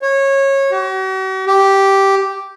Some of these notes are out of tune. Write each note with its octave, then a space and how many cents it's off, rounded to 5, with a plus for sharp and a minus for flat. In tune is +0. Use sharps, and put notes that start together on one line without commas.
C#5 -20
F#4 +45
G4 -5